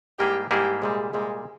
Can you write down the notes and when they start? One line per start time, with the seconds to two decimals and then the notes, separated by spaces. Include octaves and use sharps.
0.19 G#2 G3 A#3 E4 G4 G#4
0.51 G#2 G3 A#3 E4 G4 G#4
0.82 C2 A#2 G3 G#3
1.14 C2 A#2 G3 G#3